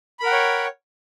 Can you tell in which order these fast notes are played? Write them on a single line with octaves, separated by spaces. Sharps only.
B5 A#4 F#5 G5 C#5